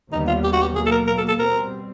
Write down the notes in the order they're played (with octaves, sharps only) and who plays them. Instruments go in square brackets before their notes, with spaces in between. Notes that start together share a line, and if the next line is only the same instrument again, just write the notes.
[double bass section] D#2 D3 G3 B3 [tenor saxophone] D#4
[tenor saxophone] F4
G4
F#4
G4
[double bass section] B2 F#3 A#3 [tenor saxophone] G#4
[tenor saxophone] A4
A#4
A#4
A4
A4
[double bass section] B2 G3 C4 [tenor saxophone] A#4